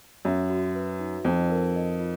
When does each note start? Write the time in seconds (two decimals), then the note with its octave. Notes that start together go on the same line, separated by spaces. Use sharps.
0.25 F#2 E5
0.50 F#4
0.75 B4
1.00 D#4
1.24 F2 F4
1.50 A#4
1.75 D#5
2.00 F4